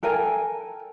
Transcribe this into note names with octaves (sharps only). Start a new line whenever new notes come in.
A4 A#4 G5 G#5